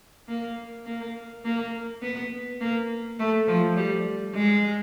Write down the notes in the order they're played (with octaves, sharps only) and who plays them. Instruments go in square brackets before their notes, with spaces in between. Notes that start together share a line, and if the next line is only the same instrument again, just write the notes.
[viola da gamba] A#3
A#3
A#3
B3
A#3
A3
F3
G3
G#3